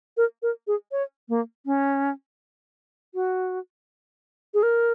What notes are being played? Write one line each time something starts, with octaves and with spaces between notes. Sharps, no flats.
A#4
A#4
G#4
C#5
A#3
C#4
F#4
G#4
A#4